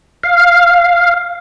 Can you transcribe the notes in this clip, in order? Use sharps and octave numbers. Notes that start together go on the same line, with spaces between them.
F5